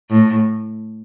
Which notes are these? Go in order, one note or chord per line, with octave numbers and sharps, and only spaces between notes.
A2